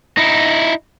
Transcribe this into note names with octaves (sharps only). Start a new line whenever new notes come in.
D#4 E4